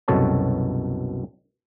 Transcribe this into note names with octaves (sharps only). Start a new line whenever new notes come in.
C2 F#2 B2 A4 C#5 A5